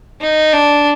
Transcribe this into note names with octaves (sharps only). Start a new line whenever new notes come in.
D#4
D4